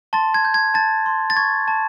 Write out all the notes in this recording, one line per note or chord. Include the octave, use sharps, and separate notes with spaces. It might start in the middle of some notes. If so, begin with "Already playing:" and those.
A5 C6 A6
G#6
G6
G#6
A5 G6 A6
C6
A6
C#6 G#6
A5